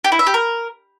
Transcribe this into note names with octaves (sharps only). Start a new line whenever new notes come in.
G4
E4
E5
G4
A#4